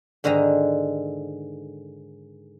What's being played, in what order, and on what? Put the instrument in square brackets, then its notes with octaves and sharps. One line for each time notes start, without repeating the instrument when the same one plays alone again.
[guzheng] G#2 D3 D#3 G#3 A#5